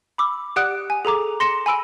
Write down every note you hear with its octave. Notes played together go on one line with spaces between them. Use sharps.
B5 D6 E6
G4 D5 F#5 D#6 F#6 D7
G#5
G#4 A4 A#5 D6
C6 A#6 C#7 E7
G#5 B5 E6 D7